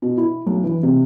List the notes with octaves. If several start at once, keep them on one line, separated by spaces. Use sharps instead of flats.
B2
E4
B1
E3
C3